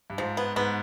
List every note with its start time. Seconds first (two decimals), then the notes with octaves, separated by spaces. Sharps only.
0.10 G2
0.18 G#2 F3
0.37 B3
0.56 G#2 B3